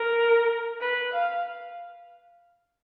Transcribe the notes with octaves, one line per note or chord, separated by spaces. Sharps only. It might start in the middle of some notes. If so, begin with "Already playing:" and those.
Already playing: A#4
B4
F5